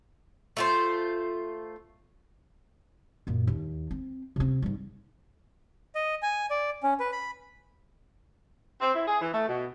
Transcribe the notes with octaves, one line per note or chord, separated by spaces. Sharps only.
A3 F4 C5
F#2 A#2
D#2
C4
C3 C4
G#2 G3
D#5
G#5
D5
C#4
B4
B5
C4
E4
G#4
E3
A3
B2